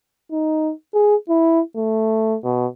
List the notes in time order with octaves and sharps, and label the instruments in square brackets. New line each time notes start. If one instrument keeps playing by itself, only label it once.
[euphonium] D#4
G#4
E4
A3
B2